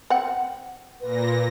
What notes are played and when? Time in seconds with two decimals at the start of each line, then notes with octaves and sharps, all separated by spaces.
0.10 C4 F#5
1.01 A#2 B4 A#6